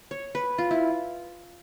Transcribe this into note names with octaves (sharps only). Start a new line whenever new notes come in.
C#5
B4
F4
E4